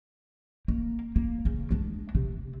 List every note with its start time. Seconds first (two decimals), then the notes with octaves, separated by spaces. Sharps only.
0.68 A#3
1.16 A#3
1.45 C#3
1.71 G#3 D4
2.15 C3